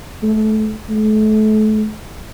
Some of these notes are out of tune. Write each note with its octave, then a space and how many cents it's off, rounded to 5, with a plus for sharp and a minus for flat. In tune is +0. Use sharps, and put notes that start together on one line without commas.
A3 -25
A3 -35